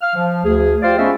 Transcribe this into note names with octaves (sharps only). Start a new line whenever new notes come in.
F5 F6
F3
D2 G#4
F4 G4 C5 D5 F5
A3 B3 C#4 C5 D#5 E5